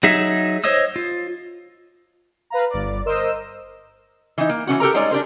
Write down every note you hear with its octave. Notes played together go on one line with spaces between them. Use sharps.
F#3 D#4 G#4 E5
C5 C#5 D#5 D#6 E6
F4
B4 F5 A#5
G1 D5
A#4 C5 D#5 E6 E7
E3 D#4
A#3
E3 G3 C#4 F#4
G4 A4 A#4 A#5
G3 G#3 D#4 C#5 D5
D4 G4 A#4 C5